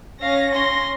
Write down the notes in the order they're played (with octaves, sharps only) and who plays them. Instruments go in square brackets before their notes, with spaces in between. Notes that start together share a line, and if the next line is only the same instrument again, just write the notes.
[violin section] C#4 A#6 [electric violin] F5
[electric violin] C6